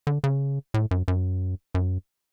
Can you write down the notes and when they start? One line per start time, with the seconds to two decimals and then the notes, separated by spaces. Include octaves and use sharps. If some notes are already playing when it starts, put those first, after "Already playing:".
0.07 D3
0.24 C#3
0.74 A2
0.91 F#2
1.08 F#2
1.75 F#2